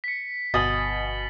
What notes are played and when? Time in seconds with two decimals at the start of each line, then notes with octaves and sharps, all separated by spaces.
0.04 B6 C#7
0.54 G1 B2 D#5 F5 G#5 A6 F#7 G7